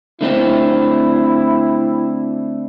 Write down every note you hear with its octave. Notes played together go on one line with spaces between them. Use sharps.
D3 A3 C4 E4